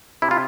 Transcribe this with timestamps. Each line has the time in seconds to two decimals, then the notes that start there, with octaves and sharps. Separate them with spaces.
0.22 C3 E4
0.31 F4